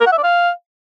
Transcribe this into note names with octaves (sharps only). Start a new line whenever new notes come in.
A#4
F#5
E5
D5
F5